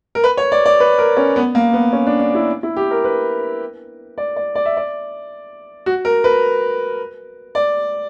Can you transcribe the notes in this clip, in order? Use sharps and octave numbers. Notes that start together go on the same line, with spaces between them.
A#4
B4
C#5
D5
D5
B4
A#4
C#4
B3
A#3
B3
C#4
D4
D4
E4
E4
G4
A#4
B4
D5
D5
D5
E5
D5
F#4
A#4
B4
D5